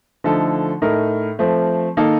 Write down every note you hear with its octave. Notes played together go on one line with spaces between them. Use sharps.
D3 F3 A3 D#4 A4
A2 A3 D#4 A#4
F3 A3 C4
D#3 A#3 D#4 A4